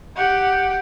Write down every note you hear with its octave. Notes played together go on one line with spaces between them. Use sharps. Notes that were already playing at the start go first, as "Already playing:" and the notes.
G4 F#5